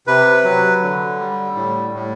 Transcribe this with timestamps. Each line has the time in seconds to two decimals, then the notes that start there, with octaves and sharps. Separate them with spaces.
0.07 C3 B4
0.44 F#3
0.81 D3
1.19 G3
1.55 A2
1.93 A2